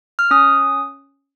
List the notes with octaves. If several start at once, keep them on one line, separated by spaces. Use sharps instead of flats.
F6
C#4 D#6